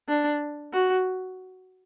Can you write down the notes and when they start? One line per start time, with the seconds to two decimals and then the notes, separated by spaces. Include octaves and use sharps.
0.09 D4
0.73 F#4